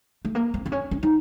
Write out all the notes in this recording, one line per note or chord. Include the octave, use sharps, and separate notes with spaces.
A3
A#3
C4
C4
C#4
C#4
D#4